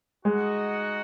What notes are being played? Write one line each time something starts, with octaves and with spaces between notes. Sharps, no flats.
G#3 D#4 F#4 D#5 F#5